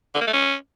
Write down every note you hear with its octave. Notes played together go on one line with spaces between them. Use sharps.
D3
A#3
A3
C#4